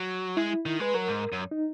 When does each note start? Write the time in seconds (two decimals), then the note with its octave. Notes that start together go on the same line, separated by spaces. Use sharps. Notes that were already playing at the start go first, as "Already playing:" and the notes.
Already playing: F#3
0.37 G#3 E4
0.66 D#3
0.80 G#3 B4
0.94 F#3 A#4
1.08 G#2
1.32 F#2
1.51 D#4